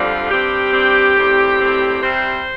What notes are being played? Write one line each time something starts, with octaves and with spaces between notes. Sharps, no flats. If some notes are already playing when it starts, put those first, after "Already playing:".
Already playing: F2 D3 G3 C4 F4
G2 G3 C4 G4
G2 G3 C4
A2 G3 C4
A2 G3 C4
C3 G3 C4 C5